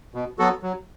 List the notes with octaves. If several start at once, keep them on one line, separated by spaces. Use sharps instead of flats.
B2
F#3 B3 F#4 A4
F#3